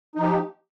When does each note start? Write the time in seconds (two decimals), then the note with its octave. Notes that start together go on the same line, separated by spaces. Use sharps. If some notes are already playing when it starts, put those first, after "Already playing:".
0.15 D#4
0.19 F3
0.22 G4